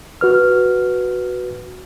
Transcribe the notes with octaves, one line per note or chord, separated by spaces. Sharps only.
F#4 B4 F6